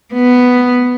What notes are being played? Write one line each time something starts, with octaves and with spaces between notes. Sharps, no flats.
B3